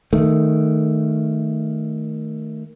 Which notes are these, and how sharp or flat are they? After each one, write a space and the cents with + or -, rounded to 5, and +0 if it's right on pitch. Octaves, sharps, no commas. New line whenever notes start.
D#3 +0 A3 +0